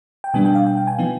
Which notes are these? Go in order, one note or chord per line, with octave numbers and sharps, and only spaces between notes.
G5
B2 G3 B3 D4 G#5
G5
F5
G5
G5
G#5
F3 B3 D#4 G5